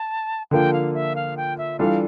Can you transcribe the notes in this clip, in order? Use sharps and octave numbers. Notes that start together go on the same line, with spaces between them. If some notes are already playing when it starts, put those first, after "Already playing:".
Already playing: A5
D3 F3 A#3 G5
F5
E5
F5
G5
E5
E3 G3 D4 F4 A4 F5